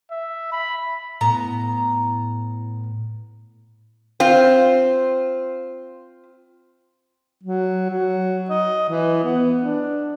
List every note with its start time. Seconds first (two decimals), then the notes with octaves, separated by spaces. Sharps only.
0.11 E5
0.52 B5
1.21 A2 B3 A#5
4.20 C4 F4
7.43 F#3
7.89 F#3
8.50 D#5
8.89 E3
9.24 B3
9.63 D4